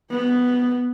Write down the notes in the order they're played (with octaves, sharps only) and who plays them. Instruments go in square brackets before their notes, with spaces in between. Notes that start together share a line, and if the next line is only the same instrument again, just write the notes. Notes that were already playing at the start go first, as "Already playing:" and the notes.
[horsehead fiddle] B3